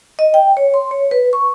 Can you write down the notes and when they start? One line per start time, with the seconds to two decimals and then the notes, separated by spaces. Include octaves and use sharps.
0.19 D#5
0.34 G5
0.57 C#5
0.74 C6
0.91 C#5
1.11 B4
1.33 C#6